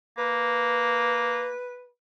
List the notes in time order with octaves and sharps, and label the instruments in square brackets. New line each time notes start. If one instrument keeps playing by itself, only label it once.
[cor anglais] A#3 [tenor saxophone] B4